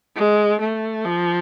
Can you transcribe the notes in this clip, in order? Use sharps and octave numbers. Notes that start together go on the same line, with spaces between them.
G#3
A3
F3